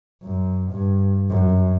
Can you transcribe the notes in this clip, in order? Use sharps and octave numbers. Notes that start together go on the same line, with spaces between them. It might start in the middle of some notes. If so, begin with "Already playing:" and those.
F#2
G2
F#2